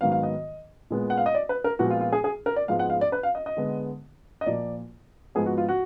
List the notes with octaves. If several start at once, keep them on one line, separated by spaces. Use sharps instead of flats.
G#2 D#3 F#3 B3 F5
F5
D#5
A#2 G#3 B3
F#5
F5
D#5
D5
B4
A#4
A#2 F3 G#3 B3 F#4
F4
F4
G#4
G#4
A#4
D5
G#2 F3 G#3 B3 F5
F#5
F5
D5
B4
F5
D#5
D#5
D3 G#3 B3
D#5
A#2 F3 A#3 D5
G#2 F3 B3 G#4
F#4
F4
F#4